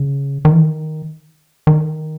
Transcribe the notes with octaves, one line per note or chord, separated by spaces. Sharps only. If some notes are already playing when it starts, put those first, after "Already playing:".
Already playing: C#3
D#3
E3
D#3
D#3